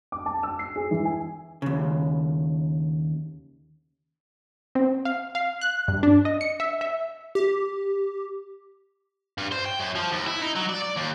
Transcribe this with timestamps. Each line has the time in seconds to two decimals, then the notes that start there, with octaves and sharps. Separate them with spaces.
0.12 D6
0.26 A5
0.43 E6
0.59 C7
0.76 G#4
0.91 E3
1.05 G#5
1.62 D#2 C#3
4.75 C4
5.05 F5
5.35 F5
5.61 F#6
5.88 G2
6.03 D4
6.25 D#5
6.41 C#7
6.60 E5
6.81 E5
7.35 G4
9.38 G2
9.52 C5
9.66 G5
9.80 F#2
9.95 F3
10.12 D#2
10.27 E4
10.42 D#4
10.56 F#3
10.69 D5
10.82 D5
10.97 D#2